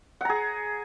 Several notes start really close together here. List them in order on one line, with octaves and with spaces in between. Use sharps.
F#5 A#5 G#4